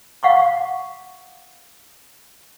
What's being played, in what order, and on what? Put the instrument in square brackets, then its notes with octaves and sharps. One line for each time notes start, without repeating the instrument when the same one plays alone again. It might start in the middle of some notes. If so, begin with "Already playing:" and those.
[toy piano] F5 F#5 C#6 D6